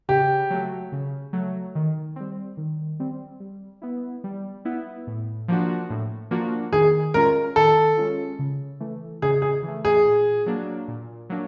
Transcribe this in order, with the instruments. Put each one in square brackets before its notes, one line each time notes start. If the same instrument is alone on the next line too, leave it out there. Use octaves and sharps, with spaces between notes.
[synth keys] C#3 [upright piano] G4
[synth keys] F#3 A3
C#3
F#3 A3
D#3
G3 C4
D#3
G3 C4
G3
B3 E4
G3
B3 E4
A2
F3 A#3 D4 F#4
A2
F3 A#3 D4 F#4
[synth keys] D#3 [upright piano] G#4
[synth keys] G#3 C#4 F4 [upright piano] A#4
[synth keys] D#3 [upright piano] A4
[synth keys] G#3 C#4 F4
C#3
E3 A3
[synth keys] C#3 [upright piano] G#4
[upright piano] G#4
[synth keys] E3
A3
[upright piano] G#4
[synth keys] A#2
F#3 A#3 D4
A#2
F#3 A#3 D4